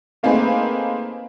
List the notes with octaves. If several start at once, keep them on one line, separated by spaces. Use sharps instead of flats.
A3 A#3 C4 D#4 G#4 B4